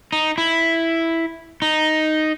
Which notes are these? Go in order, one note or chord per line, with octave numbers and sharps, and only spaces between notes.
D#4
E4
D#4